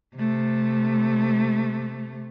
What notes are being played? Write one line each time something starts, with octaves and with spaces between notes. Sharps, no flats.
C3 A3